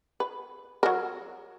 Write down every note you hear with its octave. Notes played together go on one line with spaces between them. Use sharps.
B4
F#3 A#4